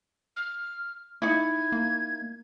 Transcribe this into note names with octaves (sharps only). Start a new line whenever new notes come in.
F6
D#4 E4 G#6
A#3